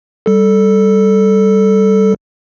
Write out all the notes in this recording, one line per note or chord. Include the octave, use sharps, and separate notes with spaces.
G3 A4